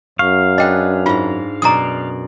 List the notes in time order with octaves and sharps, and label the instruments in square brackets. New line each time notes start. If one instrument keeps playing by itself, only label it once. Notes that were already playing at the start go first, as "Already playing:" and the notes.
[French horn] F#2 [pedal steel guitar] F5 [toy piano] C#6
[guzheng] D4 G#4 B4 [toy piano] D#5 G5
[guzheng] G#2 A#5 [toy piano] F4
[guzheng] F#2 B2 D5 [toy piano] A#5 D#6